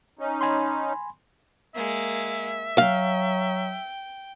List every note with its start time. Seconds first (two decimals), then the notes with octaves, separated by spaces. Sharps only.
0.19 C#4 D#4
0.41 G#5 B5 C6
1.75 G#3 A#3 E5
2.78 F#3 F5 G5